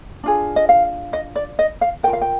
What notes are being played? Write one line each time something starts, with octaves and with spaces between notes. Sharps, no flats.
D4 F4 G#4
D#5
F5
D#5
D5
D#5
F5
F4 A#4 G5
F5
G5